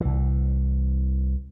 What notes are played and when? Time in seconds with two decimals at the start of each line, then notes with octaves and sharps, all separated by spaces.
0.01 C2 E3